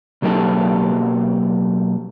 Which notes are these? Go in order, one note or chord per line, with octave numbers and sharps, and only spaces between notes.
B1 F#3 A#3 D#4 G4 A4